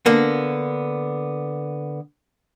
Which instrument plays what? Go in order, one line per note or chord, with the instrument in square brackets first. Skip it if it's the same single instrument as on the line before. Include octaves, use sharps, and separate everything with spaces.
[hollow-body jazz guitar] D3 A#3 B3